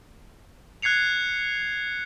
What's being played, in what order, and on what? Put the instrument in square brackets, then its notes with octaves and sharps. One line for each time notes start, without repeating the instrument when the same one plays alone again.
[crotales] F#6 G#6 C7 C#7 F7